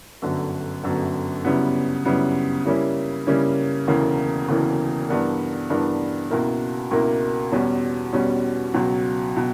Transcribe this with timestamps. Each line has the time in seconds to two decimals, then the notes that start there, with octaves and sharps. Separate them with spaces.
0.22 G1 F#2 D3
0.83 G1 F#2 D3
1.44 F#2 C#3 G3 B3 E4
2.05 F#2 C#3 G3 B3 E4
2.66 C#3 G3 A#3 C#4 E4
3.27 C#3 G3 A#3 C#4 E4
3.87 E1 D2 C#3 E3 A#3
4.48 E1 D2 C#3 E3 A#3
5.09 G2 E3 B3 D4 A#4
5.70 G2 E3 B3 D4 A#4
6.31 C#2 B2 A#3 E4 A#4
6.91 C#2 B2 A#3 E4 A#4
7.52 E2 B2 G3 C#4
8.13 E2 B2 G3 C#4
8.74 C#2 B2 F#3
9.36 B2